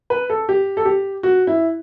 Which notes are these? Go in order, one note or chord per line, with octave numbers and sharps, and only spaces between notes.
B4
A4
G4
A4
G4
F#4
E4